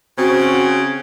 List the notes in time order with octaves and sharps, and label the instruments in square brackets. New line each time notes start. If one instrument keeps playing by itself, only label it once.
[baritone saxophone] C#3 [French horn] C4 [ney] F#4